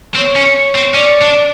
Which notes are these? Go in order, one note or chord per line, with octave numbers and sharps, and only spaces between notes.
C4 C#5
C#4
C4
C#4 D5
D4